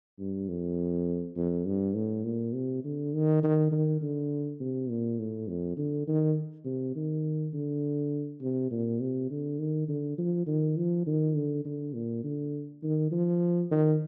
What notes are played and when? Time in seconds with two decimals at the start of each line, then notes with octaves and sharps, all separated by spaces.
0.19 G2
0.49 F2
1.37 F2
1.66 G2
1.95 A2
2.25 A#2
2.54 C3
2.84 D3
3.14 D#3
3.43 D#3
3.72 D#3
4.02 D3
4.61 C3
4.90 A#2
5.19 A2
5.48 F2
5.77 D3
6.08 D#3
6.65 C3
6.95 D#3
7.54 D3
8.41 C3
8.71 A#2
9.00 C3
9.31 D3
9.59 D#3
9.89 D3
10.18 F3
10.47 D#3
10.77 F3
11.07 D#3
11.36 D3
11.66 D3
11.94 A#2
12.24 D3
12.83 D#3
13.12 F3
13.71 D#3